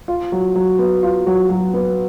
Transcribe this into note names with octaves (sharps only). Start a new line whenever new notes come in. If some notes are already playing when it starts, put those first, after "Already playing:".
F4
F#3
F#3
B3
F4
F#3
F#3
B3